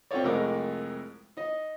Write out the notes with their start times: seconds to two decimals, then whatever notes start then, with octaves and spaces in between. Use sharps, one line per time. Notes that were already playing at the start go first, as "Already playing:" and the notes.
0.11 C4 C#4 F4 A4 C#5 D5
0.23 C2 F2 G#3 A3 A#4 D6
1.37 D#4 D#5